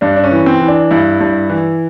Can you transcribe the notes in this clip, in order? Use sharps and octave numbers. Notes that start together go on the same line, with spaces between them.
G2 D4
D4
C#4
E3
C4
E3
D4
G2 E4
G2
E3